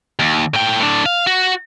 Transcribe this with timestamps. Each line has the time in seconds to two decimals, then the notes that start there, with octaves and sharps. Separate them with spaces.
0.19 D#2
0.54 A2 G5
0.80 A2 D4
1.06 F5
1.27 F#4